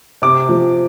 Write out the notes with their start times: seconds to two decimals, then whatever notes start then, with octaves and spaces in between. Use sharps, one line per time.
0.22 C3 D6
0.49 F3